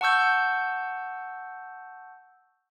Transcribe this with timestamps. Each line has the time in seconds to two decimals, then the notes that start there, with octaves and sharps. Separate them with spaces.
0.01 F#5 A5 C#6 E6 G6